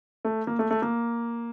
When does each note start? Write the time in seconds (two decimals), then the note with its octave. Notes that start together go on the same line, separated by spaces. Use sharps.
0.25 A3
0.47 A#3
0.59 A3
0.71 A3
0.82 A#3